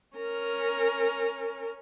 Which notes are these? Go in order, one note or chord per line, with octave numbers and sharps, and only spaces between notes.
C#4 A#4